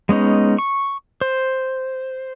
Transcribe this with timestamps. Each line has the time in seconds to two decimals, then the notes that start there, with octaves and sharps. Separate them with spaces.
0.09 G#3 B3 C#4 D#4
0.58 C#6
1.21 C5